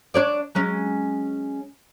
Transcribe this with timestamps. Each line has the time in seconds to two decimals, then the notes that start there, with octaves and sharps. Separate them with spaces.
0.14 D4 C#5 D5
0.55 F#3 G#3 C#4